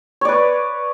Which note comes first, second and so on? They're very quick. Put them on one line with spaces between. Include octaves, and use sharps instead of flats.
C#5 D5 B4